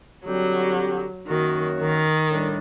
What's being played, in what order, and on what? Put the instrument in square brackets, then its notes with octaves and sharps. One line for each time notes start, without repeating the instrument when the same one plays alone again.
[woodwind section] D3 G3 C4 G4 [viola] F#3
[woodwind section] F#2 F#3 A#3 F#4 [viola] D#3
[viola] D#3
[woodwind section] A2 G3 D4